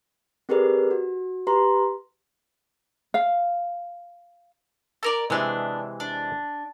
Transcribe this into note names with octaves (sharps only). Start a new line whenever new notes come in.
C4 G4 G#4 A#4 B4 D5
F#4
G4 B4 A#5 C6
F5
A4 A#4 D5
C3 E3 G#3 B3 D4
D4